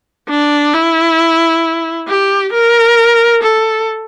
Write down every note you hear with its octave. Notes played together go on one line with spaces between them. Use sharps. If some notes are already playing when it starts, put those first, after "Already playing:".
D4
E4
G4
A#4
A4